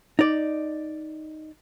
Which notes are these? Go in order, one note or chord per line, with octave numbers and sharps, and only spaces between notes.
D#4 D5